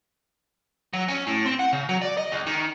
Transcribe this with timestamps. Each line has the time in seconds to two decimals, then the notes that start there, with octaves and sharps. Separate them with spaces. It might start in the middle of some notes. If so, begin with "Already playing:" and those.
0.93 F#3
1.08 C#4
1.27 A2
1.46 C4
1.59 F#5
1.73 C#3
1.89 F#3
2.02 D5
2.17 D#5
2.32 C#2
2.46 D#3